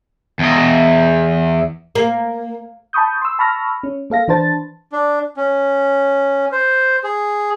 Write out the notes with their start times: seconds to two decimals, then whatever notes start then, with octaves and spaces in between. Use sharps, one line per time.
0.39 E2 D#5
1.95 A#3
2.93 A5 B5 C#6 D#6 G6
3.22 C6 E6
3.39 A5 B5 C#6 E6 F6 A#6
3.83 C#4
4.10 A#3 A4 F5 A#6
4.28 E3 D4 B4 C5 A5 A6
4.92 D4
5.37 C#4
6.52 C5
7.04 G#4